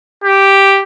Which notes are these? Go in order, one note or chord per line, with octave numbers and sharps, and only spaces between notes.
G4